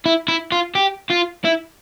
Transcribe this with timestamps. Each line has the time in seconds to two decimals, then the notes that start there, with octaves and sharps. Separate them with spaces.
0.06 E4
0.28 E4
0.52 F4
0.75 G4
1.10 F4
1.44 E4